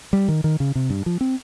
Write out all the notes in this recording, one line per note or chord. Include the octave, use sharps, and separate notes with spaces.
G3
D#3
D#3
C#3
C3
G2
F3
C4